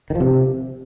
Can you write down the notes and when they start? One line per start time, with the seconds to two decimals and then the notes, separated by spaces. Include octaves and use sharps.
0.10 D#3
0.15 F3
0.20 C3